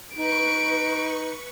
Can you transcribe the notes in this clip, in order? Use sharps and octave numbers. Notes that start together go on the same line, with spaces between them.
D#4 B4 C#6 C#7 D7